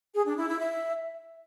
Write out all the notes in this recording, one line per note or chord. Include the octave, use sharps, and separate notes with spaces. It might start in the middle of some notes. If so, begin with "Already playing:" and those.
G#4
D4
E4
E4
E5